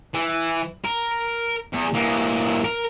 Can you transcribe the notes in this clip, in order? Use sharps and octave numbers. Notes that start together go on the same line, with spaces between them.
E3
A#4
E2
E3 A#3
A#4